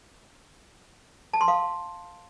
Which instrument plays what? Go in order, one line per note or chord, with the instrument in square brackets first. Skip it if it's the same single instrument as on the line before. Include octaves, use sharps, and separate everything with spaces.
[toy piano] A5
C6
F5